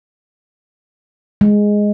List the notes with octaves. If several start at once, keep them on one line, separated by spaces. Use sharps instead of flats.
G#3